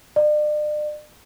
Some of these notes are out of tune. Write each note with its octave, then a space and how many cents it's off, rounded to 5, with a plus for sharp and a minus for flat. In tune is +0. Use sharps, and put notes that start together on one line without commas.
D5 +40